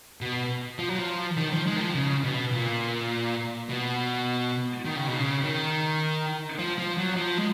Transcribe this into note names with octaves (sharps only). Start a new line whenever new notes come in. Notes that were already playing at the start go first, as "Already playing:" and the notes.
B2
F3
F#3
F3
D#3
F3
G#3
D#3
F3
C#3
B2
A#2
B2
D#3
C#3
B2
C#3
D#3
F3
F3
F#3
F3
G#3